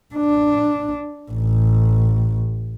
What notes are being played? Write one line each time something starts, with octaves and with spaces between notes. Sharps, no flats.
D4
A1